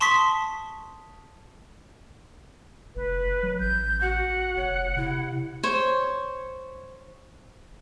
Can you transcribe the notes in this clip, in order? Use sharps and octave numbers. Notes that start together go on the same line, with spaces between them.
A5 C6 C#6 D#6 B6
F1 B4
F#3
A1 G6
F#4 F#5
F1 C#5
C3 E4
C5 C#5